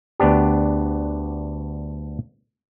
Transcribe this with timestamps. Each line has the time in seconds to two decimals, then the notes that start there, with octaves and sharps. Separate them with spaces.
0.20 D2 B3 D4 G4